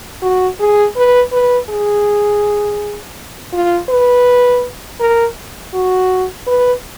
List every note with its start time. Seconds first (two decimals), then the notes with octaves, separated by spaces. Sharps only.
0.22 F#4
0.60 G#4
0.96 B4
1.32 B4
1.69 G#4
3.53 F4
3.89 B4
5.00 A#4
5.74 F#4
6.47 B4